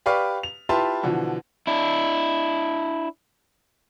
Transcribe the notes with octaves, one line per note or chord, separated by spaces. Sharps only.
G4 B4 D5 F5 C#6
F7
E4 F4 G4 B4 A5 C6
B2 D3 E3 F3
D4 E4